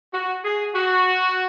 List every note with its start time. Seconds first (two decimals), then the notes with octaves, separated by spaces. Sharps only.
0.13 F#4
0.44 G#4
0.75 F#4